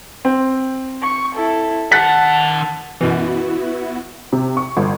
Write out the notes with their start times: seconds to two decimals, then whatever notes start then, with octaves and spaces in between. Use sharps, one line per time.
0.25 C4
1.02 C#6
1.35 E4 A4
1.92 D#3 F#5 A5 F#6 A6 B6
3.01 F#2 B2 E3 B3 E4 F#4
4.32 C3
4.57 C#6
4.77 G1